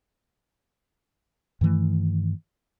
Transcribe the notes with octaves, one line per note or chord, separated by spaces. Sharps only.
G2 D#3 E3 A3